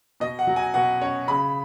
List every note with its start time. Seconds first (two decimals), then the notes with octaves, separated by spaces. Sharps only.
0.20 B2 D#5
0.39 F#5
0.47 F#3
0.56 G#5
0.74 B2 F#5
1.01 C#4 C#5
1.28 C#3 B5